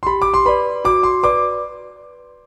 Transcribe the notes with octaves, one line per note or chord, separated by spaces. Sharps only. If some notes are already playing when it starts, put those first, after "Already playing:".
C6
G4 B5
D6
C6
B4 D5 B5
F#4 D6
C6
B4 D5 D6